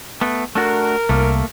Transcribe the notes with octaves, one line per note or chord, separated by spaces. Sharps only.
A3 B3
A3 D4 F#4 A#4
C2 A3 A#3